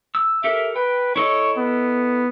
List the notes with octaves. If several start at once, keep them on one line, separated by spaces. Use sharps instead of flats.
E6
G4 A4 A#4 E5
B4 G5
E4 A4 C#5 D#5
B3